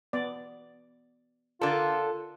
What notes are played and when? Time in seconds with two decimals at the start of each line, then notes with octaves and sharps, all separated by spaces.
0.13 B3 D5
1.61 D3 F4 A4 A#4 D5